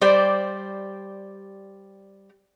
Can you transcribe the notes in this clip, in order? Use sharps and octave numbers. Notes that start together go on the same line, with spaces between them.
G3 G4 C5 D5